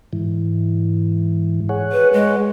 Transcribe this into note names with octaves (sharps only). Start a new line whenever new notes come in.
G#2 E3
G#4 C#5 F#5
B4
G#3